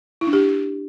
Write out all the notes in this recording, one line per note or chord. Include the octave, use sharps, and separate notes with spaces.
E4
D4
G4